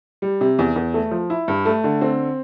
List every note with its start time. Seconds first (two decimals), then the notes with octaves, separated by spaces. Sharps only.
0.22 G3
0.41 C3
0.59 E2
0.76 E2
0.94 A3
1.11 F3
1.30 E4
1.48 G2
1.65 A3
1.84 D3
2.01 C4